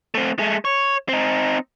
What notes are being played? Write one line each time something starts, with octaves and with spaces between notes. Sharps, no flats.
A3 C4
G#3 A3
C#5
C4 D#4